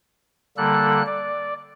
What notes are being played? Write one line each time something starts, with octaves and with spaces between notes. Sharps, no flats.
D3 G3 A#3 A4 F#6
D5